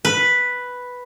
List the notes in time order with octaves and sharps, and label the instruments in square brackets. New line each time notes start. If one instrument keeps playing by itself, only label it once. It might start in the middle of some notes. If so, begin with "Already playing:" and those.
[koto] B4